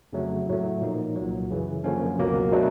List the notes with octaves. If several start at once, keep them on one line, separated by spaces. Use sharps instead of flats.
F2 C#3 F#3 A3
A2 F#3 A3
A#2 F3 A#3 D#4
C2 A#2 F#3
F#2 C#3 E3
F#2 D3 F3 A#3 C#4
C#2 B2 F#3 A#3
B2 F#3 A3 D4